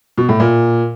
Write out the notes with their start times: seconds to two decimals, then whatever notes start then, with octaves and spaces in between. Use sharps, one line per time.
0.18 B2
0.29 A2
0.40 A#2